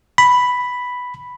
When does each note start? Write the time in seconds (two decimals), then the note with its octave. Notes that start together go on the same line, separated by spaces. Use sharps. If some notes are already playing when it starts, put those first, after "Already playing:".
0.18 B5